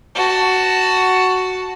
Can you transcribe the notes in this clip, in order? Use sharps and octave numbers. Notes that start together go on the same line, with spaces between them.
F#4 A5